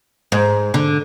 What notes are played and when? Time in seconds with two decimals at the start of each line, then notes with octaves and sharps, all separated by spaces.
0.32 G#2
0.74 D3